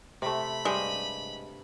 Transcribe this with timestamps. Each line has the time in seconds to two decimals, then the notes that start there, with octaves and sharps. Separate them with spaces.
0.22 C3 A3 B5
0.65 G2 G#3 G5